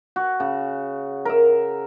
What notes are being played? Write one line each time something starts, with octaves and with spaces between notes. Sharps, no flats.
F#4
C#3
A#4 E5